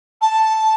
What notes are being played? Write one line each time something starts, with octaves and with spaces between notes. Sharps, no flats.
A5